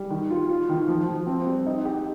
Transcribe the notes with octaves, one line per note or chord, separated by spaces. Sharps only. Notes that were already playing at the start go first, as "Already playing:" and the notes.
Already playing: G3
D#3
F4
F4
D#3
F3
F3
C4
G3
D#4
G4